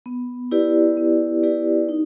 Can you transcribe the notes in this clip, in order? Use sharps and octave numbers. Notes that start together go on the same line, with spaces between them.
B3
E4 G4 B4 D5
B3
E4 G4 B4 D5
D#4